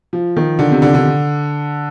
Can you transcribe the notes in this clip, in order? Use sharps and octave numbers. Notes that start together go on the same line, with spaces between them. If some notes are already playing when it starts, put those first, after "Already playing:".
F3
D#3
D3
C3
D3
D3